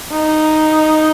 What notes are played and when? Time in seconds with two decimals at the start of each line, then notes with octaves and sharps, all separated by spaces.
0.12 D#4